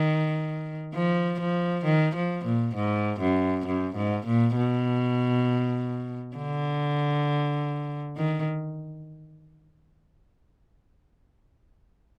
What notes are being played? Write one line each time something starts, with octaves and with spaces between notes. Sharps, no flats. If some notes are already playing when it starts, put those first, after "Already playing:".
Already playing: D#3
F3
F3
D#3
F3
A#2
G#2
F#2
F#2
G#2
A#2
B2
D3
D#3